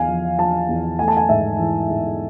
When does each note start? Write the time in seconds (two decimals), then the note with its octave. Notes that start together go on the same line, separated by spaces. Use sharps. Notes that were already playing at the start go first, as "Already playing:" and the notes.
Already playing: E2 F5 G#5
0.08 F3
0.38 F3 A5
0.68 E2
0.99 A3 G#5
1.08 A5
1.17 G#5
1.29 G#2 E5
1.59 E3
1.89 G#2